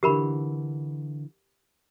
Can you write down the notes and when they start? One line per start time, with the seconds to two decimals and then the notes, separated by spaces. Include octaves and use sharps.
0.03 D3 E3 G4 A#4 B5